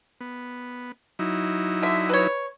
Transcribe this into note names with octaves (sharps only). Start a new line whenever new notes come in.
B3
F#3 D#4 E4
D3 E5
B4 C#5